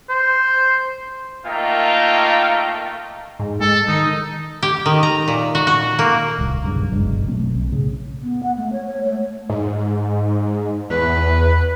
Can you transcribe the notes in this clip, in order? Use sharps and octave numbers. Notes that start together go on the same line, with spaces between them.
C5
A3 A#3 D#4 F4 A#4 G5
G#2
G#3 A4
D#3 D#4
G4
D#3
A#5
A#2
F#4
F#4
A#3
D1 C2
D#1 B1 G2 C#3
F#1 B1 G2 G#3
B2 F#3 A3 C4
B1
A2 C#3
B3
F#5
A3
C#5
C#5
A3
G#2
E2 B4